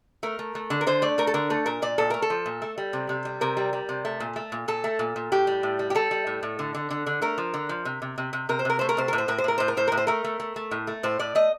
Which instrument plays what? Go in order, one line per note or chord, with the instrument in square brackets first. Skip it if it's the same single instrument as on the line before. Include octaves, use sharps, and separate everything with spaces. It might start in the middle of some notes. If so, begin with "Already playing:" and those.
[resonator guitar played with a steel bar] A3 A#4
A3
A3
D3
A#4
D3 C5
A3 D5
A3 A#4
A4
D3 A#4
A3 A4
A#2 A#4
A#2 D5
A#2 A4
A3 A#4
A4
F3
A#2
A3
G3
C3
C3
G3
C3 A#4
G3
G3
C3
A3
A#2
A3
A#2
A#2 A4
A3
A#2
A#2
A2 G4
G3
A2
G3
G4
G3 A4
G3
A2
A2
D3
D3
D3
D3
A3 A#4
F3
D3
F3
C3
C3
C3
C3
C3 A#4
C5
C3 A#4
A3 C5
A#4
C3 C5
A#4
A2
C5
A2 A#4
C5
A2 A#4
A2 C5
A#4
A2 C5
A2 A#4
C5
A3 A#4
A3
A3
A3
A2
A3
A2 C5
A2 D5
A3 D#5